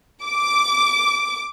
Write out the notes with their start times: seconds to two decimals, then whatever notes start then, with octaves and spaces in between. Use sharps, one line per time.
0.24 D6